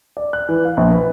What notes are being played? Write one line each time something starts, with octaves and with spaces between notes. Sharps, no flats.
D5
F#6
E3
F5
A#1
B4